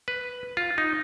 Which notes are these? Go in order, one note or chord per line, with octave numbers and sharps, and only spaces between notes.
B4
F4
D#4